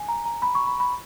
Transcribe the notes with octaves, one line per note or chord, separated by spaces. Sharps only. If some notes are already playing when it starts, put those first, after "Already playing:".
Already playing: G#5
A#5
A#5
B5
C#6
B5
B5